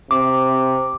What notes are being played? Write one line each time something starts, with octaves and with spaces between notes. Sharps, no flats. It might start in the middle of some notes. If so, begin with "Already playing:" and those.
C3 D6